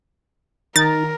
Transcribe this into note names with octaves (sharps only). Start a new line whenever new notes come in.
D#3 D#4 A#4 A#5 A6